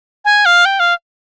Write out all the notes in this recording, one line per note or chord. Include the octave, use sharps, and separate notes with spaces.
G#5
F5
G5
F5